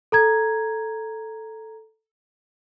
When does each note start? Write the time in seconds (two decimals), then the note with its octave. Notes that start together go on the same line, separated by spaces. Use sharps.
0.12 A4 A#5 G#6